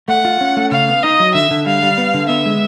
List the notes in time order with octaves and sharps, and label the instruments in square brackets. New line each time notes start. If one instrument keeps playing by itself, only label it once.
[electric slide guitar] A3 [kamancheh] F#5
[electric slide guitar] F4
C#4
A3
[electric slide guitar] C#3 [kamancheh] F5
[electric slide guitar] B3
[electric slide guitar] D#4 [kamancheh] D#5
[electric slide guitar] F#3
[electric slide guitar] D3 [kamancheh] E5
[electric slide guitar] D3
[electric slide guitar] G3 [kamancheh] F5
[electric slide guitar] G3
B3
D3
[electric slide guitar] B3 [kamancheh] E5
[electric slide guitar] G#3